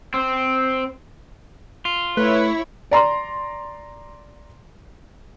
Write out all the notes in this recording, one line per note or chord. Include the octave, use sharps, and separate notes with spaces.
C4
F4
A3 E4 B4 C#5
D5 A#5 C6